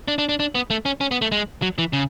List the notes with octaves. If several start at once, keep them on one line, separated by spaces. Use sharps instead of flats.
D4
D4
D4
D4
B3
A3
C#4
C#4
B3
A3
G#3
F#3
E3
C#3